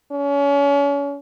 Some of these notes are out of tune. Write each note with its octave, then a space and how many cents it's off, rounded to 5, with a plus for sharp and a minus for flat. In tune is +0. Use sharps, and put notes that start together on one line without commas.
C#4 +35